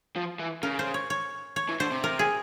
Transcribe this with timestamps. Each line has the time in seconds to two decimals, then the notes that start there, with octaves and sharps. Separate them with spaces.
0.16 F3
0.39 E3
0.63 C#3 A#4
0.79 C5
0.94 C#5
1.10 C#5
1.56 C#5
1.69 E3
1.80 D3 C5
1.92 C3
2.04 A#4
2.19 G#4